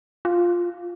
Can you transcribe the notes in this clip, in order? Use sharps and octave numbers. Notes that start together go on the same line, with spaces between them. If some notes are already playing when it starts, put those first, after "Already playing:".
F4